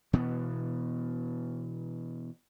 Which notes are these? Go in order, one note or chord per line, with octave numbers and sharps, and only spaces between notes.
B2 E3 B3